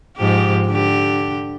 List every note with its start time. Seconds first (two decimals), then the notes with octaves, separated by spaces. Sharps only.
0.17 G#2 F3 G4
0.67 D3 G4